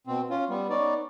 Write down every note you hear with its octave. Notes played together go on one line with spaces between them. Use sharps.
B2 C4
C#4 F4
G3 B3
B3 C#4 D#4 D5